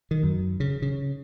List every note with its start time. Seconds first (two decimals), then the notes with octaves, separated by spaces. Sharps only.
0.11 D#3
0.23 F#2
0.60 C#3
0.82 C#3